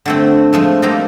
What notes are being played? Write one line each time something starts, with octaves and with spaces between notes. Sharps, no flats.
D3 A3 C4
F3 G#3 A3
G3 A#3 C4 D#4 F4